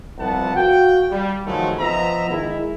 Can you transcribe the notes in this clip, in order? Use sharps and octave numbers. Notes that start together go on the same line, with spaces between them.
C2 F3 B3 F#5 A5
F#4 F5 G5
G3
D#3 F3 F#3 G#3 A3
F3 B3 D#5 E5 A#5
D#3 G#3 E4